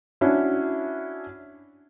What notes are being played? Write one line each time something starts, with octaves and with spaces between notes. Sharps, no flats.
C#4 D4 E4 F#4